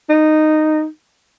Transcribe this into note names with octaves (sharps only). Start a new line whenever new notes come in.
D#4